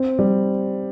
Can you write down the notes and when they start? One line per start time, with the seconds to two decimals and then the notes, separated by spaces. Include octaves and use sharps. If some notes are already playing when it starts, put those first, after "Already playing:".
Already playing: C4
0.19 G3